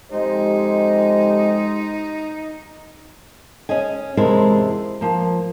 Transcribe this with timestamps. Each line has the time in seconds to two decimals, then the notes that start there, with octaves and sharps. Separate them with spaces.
0.12 F2 G#3 D#4 G4 C5 D#5
3.69 C#4 G#4 D#5 G#5
4.17 E2 C3 G#3 E4 A#4 A5
5.01 F3 A#3